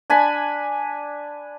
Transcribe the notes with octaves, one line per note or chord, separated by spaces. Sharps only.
D4 G#5 B5